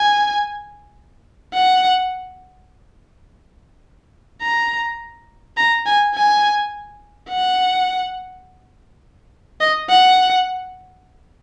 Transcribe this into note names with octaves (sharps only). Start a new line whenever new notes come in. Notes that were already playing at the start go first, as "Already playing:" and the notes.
Already playing: G#5
F#5
A#5
A#5
G#5
G#5
F#5
D#5
F#5